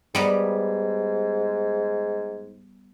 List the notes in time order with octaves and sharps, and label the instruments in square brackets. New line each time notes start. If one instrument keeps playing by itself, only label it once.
[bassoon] G#2 [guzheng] G3 B3 A#5